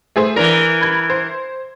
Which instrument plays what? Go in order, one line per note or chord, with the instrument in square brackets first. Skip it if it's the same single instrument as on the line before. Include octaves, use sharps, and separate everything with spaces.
[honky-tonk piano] A3 G#4 C5
[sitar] E3 A#4 [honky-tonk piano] D4 A#6
[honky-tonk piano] B5 G#6
C5